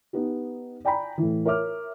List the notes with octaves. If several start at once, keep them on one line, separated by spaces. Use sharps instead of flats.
B3 D#4 G4
D5 G5 G#5 A#5 B5
A2 E3
A#4 C#5 E5 D6 F6